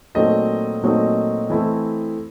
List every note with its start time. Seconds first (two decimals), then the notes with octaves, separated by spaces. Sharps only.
0.15 A#2 F#3 A3 C4 D#4 D#5
0.83 A#2 F#3 A3 C4 D#4
1.50 E3 A3 C4 E4